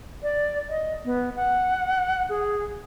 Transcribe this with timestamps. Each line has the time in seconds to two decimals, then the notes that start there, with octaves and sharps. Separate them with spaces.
0.23 D5
0.69 D#5
1.05 B3
1.36 F#5
2.29 G#4